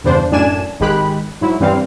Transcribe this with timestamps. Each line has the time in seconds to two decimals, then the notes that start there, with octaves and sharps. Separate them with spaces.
0.04 E2 G2 C#3 D4 C5
0.32 F#2 A2 D4 D5 G#5 E7
0.80 G#1 D#3 G#3 G4 B5 F#6
1.41 G#2 F#3 E4
1.60 G2 E3 G3 C4 F5